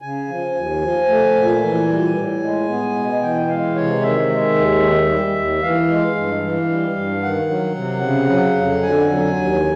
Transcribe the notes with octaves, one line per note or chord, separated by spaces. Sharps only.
C#3 G#5
F3
D#2
F3
A3
A#2
E3
G3
A2
G#3
B3
B2
E3 G5
G#3 F5
C3 C#5
D#3 E5
G#3
D#2
D#3
G3
D#2
E3 F5
G#3
G2
E3
G3
G2
D#3 F#5
F#3
C3
C#3
F#3
F2
D3 G#5
F#3
D#2